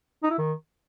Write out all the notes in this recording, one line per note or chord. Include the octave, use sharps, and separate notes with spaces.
D#4
E4
D#3